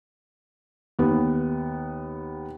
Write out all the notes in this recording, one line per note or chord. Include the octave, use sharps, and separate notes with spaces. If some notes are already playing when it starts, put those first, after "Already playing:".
D#2 B3